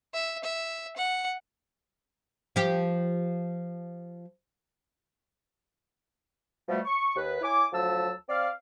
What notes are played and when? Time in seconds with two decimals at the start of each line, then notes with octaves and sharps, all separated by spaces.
0.14 E5
0.44 E5
0.97 F#5
2.56 F3 G4
6.69 B2 F3 G3 A3
6.85 C#6
7.16 D#2 B4
7.42 E4 C#5 G#5 D6
7.73 D2 F3 F#3 A5 E6
8.29 C4 D5 F5